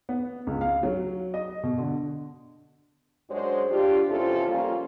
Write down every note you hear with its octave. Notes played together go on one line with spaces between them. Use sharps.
B3
C#2
F5
F#3
D#5
B2
D3
F#2 G#3 D4 F#4 C5 C#5
D4 F4 G4
E2 C3 C#4 F4 A4 C5
F3 G3 A#3 C#4 F4